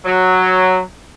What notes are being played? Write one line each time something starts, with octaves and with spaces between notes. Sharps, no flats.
F#3